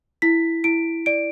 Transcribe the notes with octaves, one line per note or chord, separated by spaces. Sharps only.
E4 B6
E4 D7
D5 D7